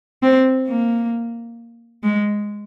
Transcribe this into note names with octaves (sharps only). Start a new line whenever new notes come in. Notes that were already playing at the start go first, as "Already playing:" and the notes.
C4
A#3
G#3